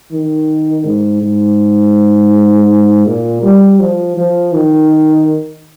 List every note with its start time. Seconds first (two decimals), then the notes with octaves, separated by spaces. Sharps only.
0.12 D#3
0.85 G#2
1.22 G#2
3.06 A#2
3.43 G3
3.80 F3
4.17 F3
4.53 D#3